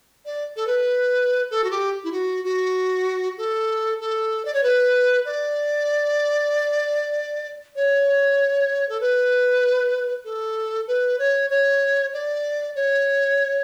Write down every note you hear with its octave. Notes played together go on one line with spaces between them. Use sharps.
D5
A4
B4
A4
F#4
G4
E4
F#4
F#4
A4
A4
D5
C#5
B4
D5
C#5
A4
B4
A4
B4
C#5
C#5
D5
C#5